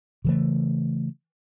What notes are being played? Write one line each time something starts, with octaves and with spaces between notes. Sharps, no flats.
C#3 E3 A3